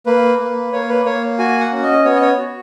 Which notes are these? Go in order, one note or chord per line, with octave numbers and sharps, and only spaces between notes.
A#3 B4
A#3
A#3 C#5
B4
A#3 C#5
F#4 G#5
F#5
C#4
D#5
B3 C#5
D#5
C#5
F#4